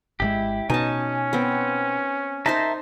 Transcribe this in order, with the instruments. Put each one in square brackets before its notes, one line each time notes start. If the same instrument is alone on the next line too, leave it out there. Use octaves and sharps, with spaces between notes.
[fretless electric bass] G#1 B2 G#3 [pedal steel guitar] E4 G4
[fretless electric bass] B2 [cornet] C#4 [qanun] D#4 A5 [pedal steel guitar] G#5
[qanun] B3 C4
[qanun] D#4 C5 C6 [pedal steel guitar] A#4 E5 A5